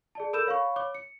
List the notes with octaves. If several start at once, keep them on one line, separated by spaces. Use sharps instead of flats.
G#4 D5 A5
A4 A#4 B5 E6 G6 E7
C#5 F5 B5 C#6
C#5 D6
C#7